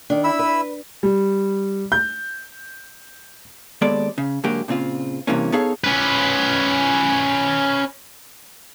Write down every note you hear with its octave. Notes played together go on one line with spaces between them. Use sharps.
D#3 D4
E4 B5 E6
B4
G3
G6
D#2 G#3 B3 A4 D5
C#3
G#2 D3 F#3 A#3 G4
A#2 C#3 C4 F4
G2 C3 E3 A#3 C#4
B3 D#4 G#4 A4 C#5 F5
C#4 B4